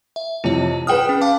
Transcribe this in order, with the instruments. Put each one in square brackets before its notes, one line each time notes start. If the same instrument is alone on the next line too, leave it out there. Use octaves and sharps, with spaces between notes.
[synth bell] E5
[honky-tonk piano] F2 C3 E3 [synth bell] F4 C#5
[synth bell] G#4 F#5 D#6 [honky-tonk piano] B4 G5 F6
[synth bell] C#4
F5 A5 D6